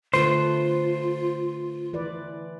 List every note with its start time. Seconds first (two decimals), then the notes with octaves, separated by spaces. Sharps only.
0.14 D3 A3 F4 B4 C5
1.93 E3 B4 D5